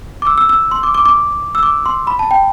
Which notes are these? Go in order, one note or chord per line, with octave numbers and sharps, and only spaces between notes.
D6
E6
E6
E6
C6
D6
D6
D6
E6
D6
C6
B5
A5
G5